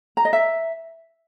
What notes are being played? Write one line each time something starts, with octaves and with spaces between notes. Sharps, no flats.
A#5
D#5
E5